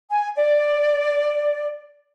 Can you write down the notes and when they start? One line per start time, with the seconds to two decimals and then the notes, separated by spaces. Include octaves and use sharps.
0.10 G#5
0.36 D5